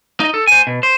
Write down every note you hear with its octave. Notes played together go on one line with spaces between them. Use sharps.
D#4 D#5
A4
C5 G#5
B2
C5